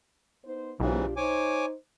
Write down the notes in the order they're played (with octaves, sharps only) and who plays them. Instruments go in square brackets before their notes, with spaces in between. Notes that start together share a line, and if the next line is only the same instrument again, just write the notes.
[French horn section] B3 D#4 C5
[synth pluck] B1 [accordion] G#2 C#3 E3 [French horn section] D4 F4 G4
[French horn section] D#4 C5 [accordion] C#5 G#5 D6